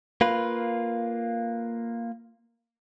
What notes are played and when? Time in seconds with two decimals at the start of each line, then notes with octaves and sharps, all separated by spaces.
0.21 A#3 F4 B4